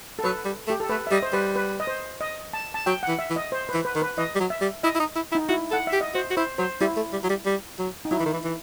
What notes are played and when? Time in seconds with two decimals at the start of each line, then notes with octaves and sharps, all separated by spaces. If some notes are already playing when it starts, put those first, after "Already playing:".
0.19 A4
0.24 F#3 B4
0.45 G3
0.67 A3
0.70 G4
0.80 A4
0.89 A3 B4
1.07 E5
1.11 G3 D#5
1.23 C5
1.33 G3 B4
1.56 B4
1.80 D#5
1.87 C5
2.21 D#5
2.53 A5
2.74 A5
2.86 F#3 G5
3.03 F#5
3.08 E3
3.19 E5
3.30 E3
3.36 D#5
3.52 C5
3.69 B4
3.74 E3
3.85 B4
3.95 D#3
4.02 B4
4.18 E3 D#5
4.35 G3
4.40 F#3
4.50 E5
4.61 G3
4.83 E4 D#5
4.95 E4
5.00 D#4
5.16 E4
5.32 E4
5.35 D#4
5.49 E4 F#4
5.71 A4 F#5
5.87 E5
5.93 G4
6.01 D#5
6.14 F#4 C5
6.30 F#4
6.37 E4 C5
6.58 F#3 C5
6.81 G3 E4
6.97 A3
7.13 G3
7.24 F#3
7.30 G3
7.46 G3
7.79 F#3
8.05 D#4
8.11 F#3 E4
8.19 E3
8.26 D#3
8.33 E3
8.44 E3